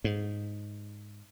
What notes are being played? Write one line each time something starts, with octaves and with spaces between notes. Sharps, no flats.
G#2